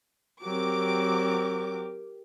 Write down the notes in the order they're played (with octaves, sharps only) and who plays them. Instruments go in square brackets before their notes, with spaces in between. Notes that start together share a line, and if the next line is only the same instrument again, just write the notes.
[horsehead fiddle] F#3 C4 [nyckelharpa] G4 A#4 [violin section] D6